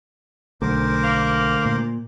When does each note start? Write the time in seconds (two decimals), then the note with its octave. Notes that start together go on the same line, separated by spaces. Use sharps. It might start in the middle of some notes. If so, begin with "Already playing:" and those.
0.62 B1 D3 A3 A#4 C5 D6
1.04 A#3
1.65 A#2